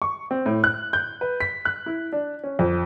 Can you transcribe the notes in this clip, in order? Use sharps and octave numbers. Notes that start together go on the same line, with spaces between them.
C#6
C4
A2
F#6
G6
B4
B6
F#6
E4
D4
C#4
F2